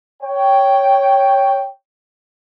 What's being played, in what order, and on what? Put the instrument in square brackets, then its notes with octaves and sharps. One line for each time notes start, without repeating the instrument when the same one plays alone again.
[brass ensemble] C#5 G5